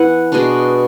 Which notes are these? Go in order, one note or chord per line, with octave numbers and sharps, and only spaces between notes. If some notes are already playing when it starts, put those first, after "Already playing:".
Already playing: E3 B3 E4 F#5 G#5
B2 G#3 B3 D4